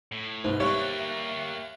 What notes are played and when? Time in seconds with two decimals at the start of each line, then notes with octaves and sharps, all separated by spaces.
0.12 A2
0.44 C2 G#2 D#4 B4 C5
0.60 G3 A#3 G4 C#5 E5 F5 F#6